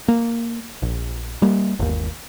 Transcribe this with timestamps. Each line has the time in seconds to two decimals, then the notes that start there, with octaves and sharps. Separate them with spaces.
0.08 A#3
0.82 A#1
1.42 G3 A#3
1.79 G1 D#2